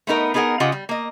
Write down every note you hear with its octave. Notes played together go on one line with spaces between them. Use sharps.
A3 B3 D#4 A#4
B3 D#4 G#4 A#4 F#5
C#3 F4 G4 D#5 F#5
G3
A#3 D#5